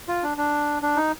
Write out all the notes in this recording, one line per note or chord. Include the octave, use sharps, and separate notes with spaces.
F4
D4
D4
D4
D#4